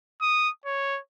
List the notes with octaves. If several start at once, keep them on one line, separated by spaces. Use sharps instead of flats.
D#6
C#5